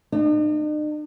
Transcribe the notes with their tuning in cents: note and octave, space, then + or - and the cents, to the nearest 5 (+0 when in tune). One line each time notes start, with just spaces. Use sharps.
D#4 -45